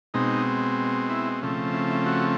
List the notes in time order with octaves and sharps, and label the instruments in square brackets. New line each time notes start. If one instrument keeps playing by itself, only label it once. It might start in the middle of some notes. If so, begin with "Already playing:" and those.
[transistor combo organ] B2 G#3 C4 D#4
E4
C#3 F3 A3 C4
E4
E4
F#4